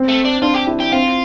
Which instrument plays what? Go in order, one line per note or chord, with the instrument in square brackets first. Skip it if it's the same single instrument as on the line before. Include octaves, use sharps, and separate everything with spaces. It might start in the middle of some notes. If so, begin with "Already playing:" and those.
Already playing: [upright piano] C4
[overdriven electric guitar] A3
D4
[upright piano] D4 [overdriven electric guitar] F4
[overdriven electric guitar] G4
[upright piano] E4
[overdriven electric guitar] G4
[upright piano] C4 [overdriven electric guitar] F4